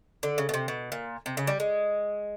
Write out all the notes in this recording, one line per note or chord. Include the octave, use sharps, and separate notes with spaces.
D3
C#3
B2
C3
B2
A#2
C3
C#3
G3
G#3